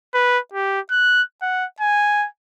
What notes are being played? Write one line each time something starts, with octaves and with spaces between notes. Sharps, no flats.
B4
G4
F#6
F#5
G#5